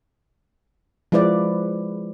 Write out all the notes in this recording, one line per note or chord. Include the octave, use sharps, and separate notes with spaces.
F3 G#3 E4 B4 D5